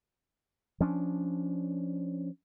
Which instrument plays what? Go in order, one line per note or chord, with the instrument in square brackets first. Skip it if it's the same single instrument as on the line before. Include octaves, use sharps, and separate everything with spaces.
[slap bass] F3 C#4 D4